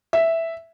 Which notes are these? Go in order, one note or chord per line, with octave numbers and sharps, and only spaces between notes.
E5